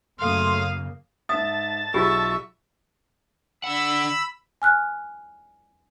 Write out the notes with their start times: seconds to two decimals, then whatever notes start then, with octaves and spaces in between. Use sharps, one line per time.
0.20 F#2 C#3 A3 A#3 F5 C6 D#6
1.29 G#2 E5 A5 D#6
1.94 B1 F4 G4 G#4 E5 C#6
3.64 D3 F#5 B5 E6
4.62 G#5 F6 F#6